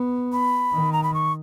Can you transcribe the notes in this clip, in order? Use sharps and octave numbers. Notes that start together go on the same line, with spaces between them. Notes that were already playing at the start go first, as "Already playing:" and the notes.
Already playing: B3
B5
D#3
A#5
B5
C#6